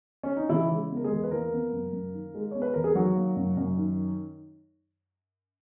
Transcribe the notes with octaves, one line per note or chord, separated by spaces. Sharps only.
C#4
D#4
C#3 E3 E4
G#3
B3
A#4
G#3 G#4
E2
B4
E3 A#3 A#4
B3
F#2
F#2
D#3
G#3
B3 C#5
B4
E2 A#4
G#4
D#3 F#3 F#4
A#3
F#2
F#2
D#3